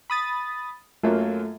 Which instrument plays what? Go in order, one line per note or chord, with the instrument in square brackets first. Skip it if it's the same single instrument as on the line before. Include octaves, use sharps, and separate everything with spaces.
[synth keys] B5 D#6 A6
[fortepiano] F#2 F#3 A#3 [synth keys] A3 F4